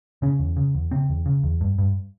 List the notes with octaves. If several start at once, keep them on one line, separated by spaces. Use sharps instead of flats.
C#3 C#4
E2
C#3
E2
C#3 C4
E2
C#3
E2
G2
G2